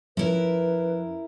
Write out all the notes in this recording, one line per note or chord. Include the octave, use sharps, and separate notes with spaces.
F2 F3 C#4 E4 A#4 B4